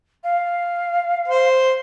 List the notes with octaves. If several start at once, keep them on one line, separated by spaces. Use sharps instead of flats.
F5
C5